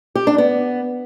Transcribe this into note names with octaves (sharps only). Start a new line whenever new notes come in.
G4
D4
B3